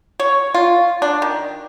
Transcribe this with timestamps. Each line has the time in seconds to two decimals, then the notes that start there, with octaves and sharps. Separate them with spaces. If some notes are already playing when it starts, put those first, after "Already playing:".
0.20 C#5
0.55 F4
1.02 D4
1.22 D#3